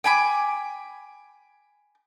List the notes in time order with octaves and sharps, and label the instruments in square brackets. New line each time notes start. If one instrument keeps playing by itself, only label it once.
[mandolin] G5 G#5 B5 D6